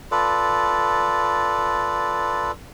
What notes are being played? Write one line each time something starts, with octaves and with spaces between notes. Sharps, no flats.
F4 A4 B4 D5